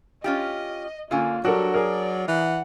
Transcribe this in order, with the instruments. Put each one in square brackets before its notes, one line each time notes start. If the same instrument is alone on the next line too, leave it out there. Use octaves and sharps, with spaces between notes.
[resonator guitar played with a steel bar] C#4 F4 G4 [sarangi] D#5
[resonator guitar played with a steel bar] D3 C#4 G#5 [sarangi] A#3 [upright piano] F4
[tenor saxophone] F#3 [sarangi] G3 [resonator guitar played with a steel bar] D4 [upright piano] F#4 A4 A#4
[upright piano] G#4 A#4 [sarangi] D5
[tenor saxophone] E3 [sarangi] F#5